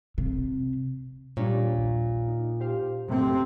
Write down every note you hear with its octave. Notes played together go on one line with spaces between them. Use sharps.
C3
A#2 G3 D4 C#5
A#1 D#2
D#4
G4 C5 F5
F#2 C3 A3 C4